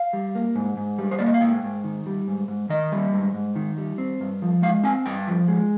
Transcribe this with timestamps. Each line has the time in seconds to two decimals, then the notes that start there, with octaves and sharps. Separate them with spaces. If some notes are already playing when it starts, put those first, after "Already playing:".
Already playing: F5
0.13 G3
0.35 A#3
0.56 G#2
0.77 G#2
0.98 G3
1.11 C5
1.19 A#3 D5
1.26 D#5
1.34 F5
1.41 G#2 G5
1.63 G#2
1.84 D#3
2.06 G3
2.28 G#2
2.48 G#2
2.69 D#3 D#5
2.92 G3
3.13 G#2
3.34 G#2
3.55 D#3
3.77 G3
3.98 C4
4.21 G2
4.42 F3
4.62 G#3 F5
4.84 C4 G#5
5.06 G2 G5
5.28 F3
5.48 G#3